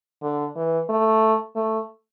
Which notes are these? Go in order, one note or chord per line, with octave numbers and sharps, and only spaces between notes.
D3
E3
A3
A3